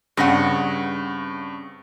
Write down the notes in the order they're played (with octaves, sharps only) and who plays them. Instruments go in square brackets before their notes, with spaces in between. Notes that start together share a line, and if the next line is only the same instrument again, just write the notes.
[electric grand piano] G2 A#6 [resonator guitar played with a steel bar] C#3 C4 F#5